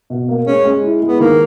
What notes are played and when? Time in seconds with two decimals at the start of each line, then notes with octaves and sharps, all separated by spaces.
0.10 B2
0.29 A#3
0.46 G#3 C#4
0.65 G#3
0.83 E4
1.01 G#3
1.08 B3
1.19 D#3 A#3